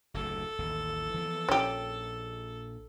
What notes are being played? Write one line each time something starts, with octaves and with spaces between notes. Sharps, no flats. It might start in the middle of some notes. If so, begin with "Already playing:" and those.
F#1 D2 A2 A4
A1 D#2
E3 F3 B3
A#1 C#4 G4